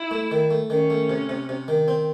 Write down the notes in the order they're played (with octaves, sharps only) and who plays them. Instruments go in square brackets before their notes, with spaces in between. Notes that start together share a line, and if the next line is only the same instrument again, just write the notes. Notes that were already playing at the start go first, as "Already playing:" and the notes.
Already playing: [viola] E4
[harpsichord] A3
D#3
A3
[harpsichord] D#3 [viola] C#4
[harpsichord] A3
C3
C3
C3
D#3
C4